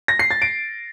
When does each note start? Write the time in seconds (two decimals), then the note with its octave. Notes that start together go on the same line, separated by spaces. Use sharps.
0.08 A#6
0.19 C7
0.31 A6
0.42 D7